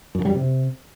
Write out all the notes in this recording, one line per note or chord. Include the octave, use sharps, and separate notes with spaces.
F#2
D3
G3
F#2
C3